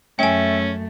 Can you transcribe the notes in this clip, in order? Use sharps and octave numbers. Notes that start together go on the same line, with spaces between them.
F#2 A3 C#4 E5 G5 G#5